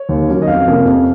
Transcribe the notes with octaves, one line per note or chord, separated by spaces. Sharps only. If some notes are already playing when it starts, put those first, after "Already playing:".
Already playing: C#5
D#2
D#3 F#3 C#4
D#5
F2 F5
C3 F3 A#3 C#4
F2